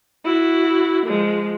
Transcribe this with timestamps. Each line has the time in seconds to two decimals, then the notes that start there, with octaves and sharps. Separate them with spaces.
0.24 E4 F#4
1.06 F3 G#3